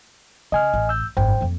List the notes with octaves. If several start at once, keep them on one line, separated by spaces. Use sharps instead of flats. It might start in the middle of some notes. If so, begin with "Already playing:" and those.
C#3 D#5 G#5 F6
A1
E6 G6
G#1 F#2 C5 G5
F2 A#3